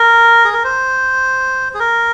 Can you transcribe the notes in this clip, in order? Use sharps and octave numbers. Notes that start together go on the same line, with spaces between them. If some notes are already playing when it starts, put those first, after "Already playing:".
Already playing: A#4
G#4
A#4
C5
G#4
A#4